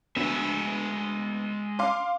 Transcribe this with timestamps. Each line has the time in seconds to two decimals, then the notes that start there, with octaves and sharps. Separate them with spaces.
0.16 D2 G#3 B3 E5
1.79 F5 C6 D6